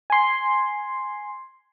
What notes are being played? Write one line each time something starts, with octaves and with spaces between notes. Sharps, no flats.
G#5 C6